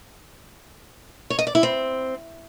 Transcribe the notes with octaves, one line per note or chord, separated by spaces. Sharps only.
C#5
D#5
D5
E4
C4